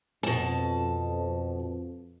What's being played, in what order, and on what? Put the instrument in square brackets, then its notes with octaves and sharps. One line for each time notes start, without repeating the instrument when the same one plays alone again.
[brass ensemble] F2 [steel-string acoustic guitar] B2 A5